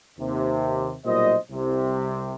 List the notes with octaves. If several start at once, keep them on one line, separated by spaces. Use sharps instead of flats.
D#2 C3
B1 A#2 G3 C5 D#5
C2 C3